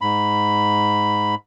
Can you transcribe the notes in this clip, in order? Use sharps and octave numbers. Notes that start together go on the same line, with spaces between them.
G#2 B5